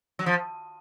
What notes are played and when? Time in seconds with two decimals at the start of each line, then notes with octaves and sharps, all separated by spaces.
0.19 F#3
0.26 F3